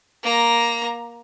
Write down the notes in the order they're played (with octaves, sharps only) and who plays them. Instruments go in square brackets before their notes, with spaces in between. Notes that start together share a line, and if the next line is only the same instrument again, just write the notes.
[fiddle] A#3 A#5